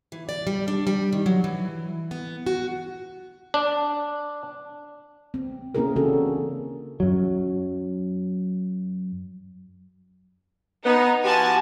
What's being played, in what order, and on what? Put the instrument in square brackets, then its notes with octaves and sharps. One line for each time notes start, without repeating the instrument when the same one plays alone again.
[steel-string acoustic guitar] E3
D5
G3
D4
G3
D#3
F#3
E3
B3
F#4
[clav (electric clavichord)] D4
[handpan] C4
A#3 C4 C#4 E4 G#4 A#4
C#3 E3 C#4 D4 F#4 A4
[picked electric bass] F#2 F#3
[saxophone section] B3 [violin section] D#4
[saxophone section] F3 F#4 G4 [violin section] G#5 A5